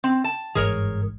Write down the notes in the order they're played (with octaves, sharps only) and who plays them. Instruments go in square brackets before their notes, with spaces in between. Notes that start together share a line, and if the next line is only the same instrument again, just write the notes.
[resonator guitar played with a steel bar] C4
A5
[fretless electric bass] G1 G#2 E3 [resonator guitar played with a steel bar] G#4 A#4 C#5